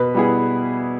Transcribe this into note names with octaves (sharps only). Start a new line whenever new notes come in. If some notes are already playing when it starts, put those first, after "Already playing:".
Already playing: B2 B4
G3 B3 E4 G#4